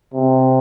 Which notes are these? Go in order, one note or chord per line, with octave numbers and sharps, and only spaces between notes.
C3